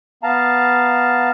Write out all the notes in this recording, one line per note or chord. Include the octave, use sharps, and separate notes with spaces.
B3 F5 A5 A#5